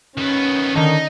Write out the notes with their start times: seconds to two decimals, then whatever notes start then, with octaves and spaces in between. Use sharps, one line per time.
0.18 D#3 B3 C#4
0.75 D3 D#3 D#4